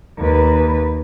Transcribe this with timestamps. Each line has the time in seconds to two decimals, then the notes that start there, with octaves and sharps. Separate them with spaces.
0.19 D#2 B4